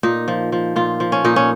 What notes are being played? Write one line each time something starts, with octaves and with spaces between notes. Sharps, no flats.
A#2 D#4
F3
F3
A#2 F4
F3
C#4
A#2 D#4
C#4